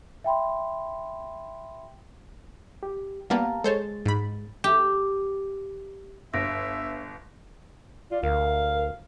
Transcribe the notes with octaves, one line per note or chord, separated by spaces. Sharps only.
E5 G5 B5 C6
G4
G3 A#3 B3 F5 A5 A#5
G#3 A4 C5 C#5 A6
G#2 B5
G4
G1 E5 A#6 D7
F4 D5
D2 A#4 F5